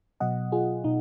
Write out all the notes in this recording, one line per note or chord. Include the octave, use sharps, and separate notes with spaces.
B2 F#3 B3 D#5 F#5
F4 G#4
B2 D#4